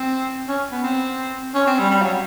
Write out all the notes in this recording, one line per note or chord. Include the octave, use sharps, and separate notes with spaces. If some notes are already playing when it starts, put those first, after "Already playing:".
Already playing: C4
C#4
B3
C4
C#4
C4
G3
G3
F#3